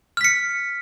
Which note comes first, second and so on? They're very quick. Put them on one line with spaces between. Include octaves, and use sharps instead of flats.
F6 B6 C#7